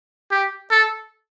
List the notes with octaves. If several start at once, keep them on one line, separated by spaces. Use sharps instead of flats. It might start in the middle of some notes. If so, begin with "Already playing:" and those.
G4
A4